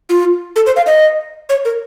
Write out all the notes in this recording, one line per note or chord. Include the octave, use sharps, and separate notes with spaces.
F4
A4
C5
F5
D#5
C#5
A#4